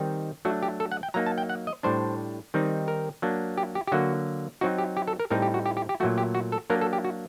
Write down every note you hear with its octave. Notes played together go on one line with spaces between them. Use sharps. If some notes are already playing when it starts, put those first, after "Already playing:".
Already playing: D#3 G3 C4 D#4
F#3 A3 D4 F#4
G4
A4
F#5
G5
F#3 A#3 D#4 A#5
A5
G5
F#5
D#5
A2 G3 D4 C5
D#3 G3 C4 D#4
A#4
F#3 A#3 D4
G4
G4
G4
D3 F#3 A#3 F#4
F#3 C4 D#4 F#4
G4
G4
A4
A#4
A2 G3 C4 D#4 A#4
G4
F#4
G4
G4
G4
A#2 F#3 A3 F#4
G4
F#4
A4
F#3 A#3 D4 A#4
A4
G4
F#4